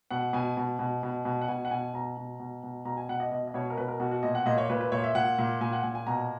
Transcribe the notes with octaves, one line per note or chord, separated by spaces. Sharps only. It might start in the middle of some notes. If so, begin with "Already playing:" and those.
B2 F#5
B2 G#5
B2
B2
B2
B2
F#5
B2 G#5
F#5
B2 G#5
B2 A#5
B2
B2
B2
B2 A#5
G#5
B2 F#5
D#5
B2 D#5
D#5
B2 C#5
A#4
B2 B4
A#4
B2 F#4
F#4
A#2 D#5
F#5
A#2 D#5
C#5
A#2 B4
B4
A#2 C#5
E5
A#2 F#5
A#2
A#2 G#5
F#5
A#2 G#5
G#5
B2 A#5